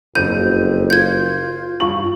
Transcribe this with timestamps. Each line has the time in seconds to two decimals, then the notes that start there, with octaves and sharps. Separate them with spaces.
0.15 F#1 F2 G6 D#7
0.90 F4 G6 G#6
1.80 G2 F4 C#6 F#7